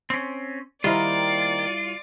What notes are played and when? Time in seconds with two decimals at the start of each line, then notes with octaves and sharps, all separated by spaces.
0.10 C4 C#4
0.84 D#3 G3 A#3 E4 F4 C5 D5